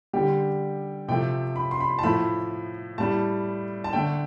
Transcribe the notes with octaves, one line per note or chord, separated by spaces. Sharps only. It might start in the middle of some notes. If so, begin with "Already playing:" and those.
D3 G3 G4
C3 F3 A3 G5
B5
C6
B5
A5
A2 F3 A3 B5
A2 G3 A5
A5
D3 A3 G5